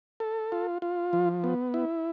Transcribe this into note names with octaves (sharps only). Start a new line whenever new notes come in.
A4
F4
F4
F3
B3
E4